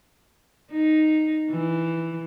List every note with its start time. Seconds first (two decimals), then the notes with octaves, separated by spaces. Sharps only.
0.72 D#4
1.51 E3